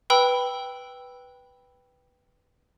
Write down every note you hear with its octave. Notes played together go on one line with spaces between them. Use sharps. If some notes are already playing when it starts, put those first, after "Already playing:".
B4 G5 B5 E6